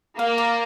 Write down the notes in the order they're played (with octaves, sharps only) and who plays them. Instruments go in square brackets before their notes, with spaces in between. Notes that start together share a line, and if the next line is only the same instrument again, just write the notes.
[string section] A#3 [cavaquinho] F5
[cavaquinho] D5